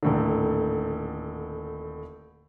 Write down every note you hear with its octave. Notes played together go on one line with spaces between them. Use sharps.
D#1 A2 D3